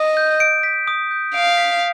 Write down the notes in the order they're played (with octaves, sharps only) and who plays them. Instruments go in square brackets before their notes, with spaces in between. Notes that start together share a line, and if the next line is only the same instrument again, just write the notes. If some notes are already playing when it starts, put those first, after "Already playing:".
Already playing: [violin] D#5 [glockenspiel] D#6
[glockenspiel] G6
D7
B6
D#6
G6
[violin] F5 [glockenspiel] D7
[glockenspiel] B6